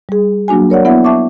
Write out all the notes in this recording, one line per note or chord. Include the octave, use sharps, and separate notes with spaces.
G3 G#4
F#3 A#3 D4 F#4 G#5
A#4 C#5 D5 F#5
B3 E4 E5 F#5
E5 A5 C#6 D6